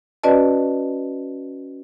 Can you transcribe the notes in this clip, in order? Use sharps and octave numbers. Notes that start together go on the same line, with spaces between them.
C#4 F#4 B4 D5 D#5 A5